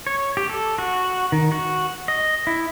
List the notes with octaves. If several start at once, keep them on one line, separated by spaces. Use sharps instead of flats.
C#5
G4
A4
F#4
D#3
F#4
D#5
E4